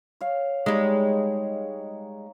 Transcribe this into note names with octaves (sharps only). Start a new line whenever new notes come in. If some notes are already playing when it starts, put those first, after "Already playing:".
C#5 F5
G3 G#3 D#4 C#5